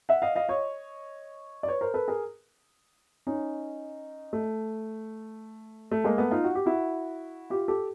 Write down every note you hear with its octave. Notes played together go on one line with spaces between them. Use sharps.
E5 F#5
D#5 F5
D#5 F5
C#5 D#5
D5
B4 C#5
A#4 C5
A4 B4
G#4 A#4
C#4 D#4
A3
A3
G#3 A#3
A3 B3
D#4 F4
F#4
G4
E4 F#4
F4 G4
G4 A4